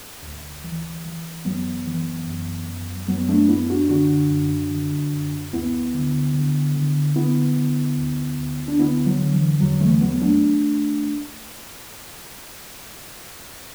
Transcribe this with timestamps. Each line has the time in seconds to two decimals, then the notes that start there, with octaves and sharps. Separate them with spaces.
0.23 D2
0.64 E3
1.05 E3
1.45 F#2 F#3 B3
1.87 E3
2.27 F#2
2.68 F#2
3.08 F#2 F#3 B3
3.29 A3 D4
3.49 F#2 B3 E4
3.70 D4 F#4
3.89 D3 D4 F#4
4.31 F#2
4.71 D3
5.12 F#2
5.53 D2 B3 E4
5.94 D3
6.34 D3
6.76 D3
7.16 D3 B3 E4
7.57 D3
7.97 D2
8.38 D2
8.68 D4
8.79 D3 B3 E4
9.06 F#3
9.20 D3
9.34 E3
9.61 E2 F#3
9.81 E3 A3
10.01 E2 F#3 B3
10.21 A3 D4